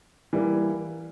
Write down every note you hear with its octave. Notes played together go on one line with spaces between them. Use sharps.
E3 G3 A#3